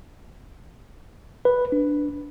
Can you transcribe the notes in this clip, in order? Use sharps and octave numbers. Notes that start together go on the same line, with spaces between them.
B4
D4